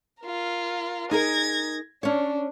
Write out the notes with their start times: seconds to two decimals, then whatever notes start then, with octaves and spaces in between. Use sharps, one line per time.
0.22 F4 A#4
1.11 D#4 G#4 A#4 G#6 A#6
2.03 C#4 D4 C#5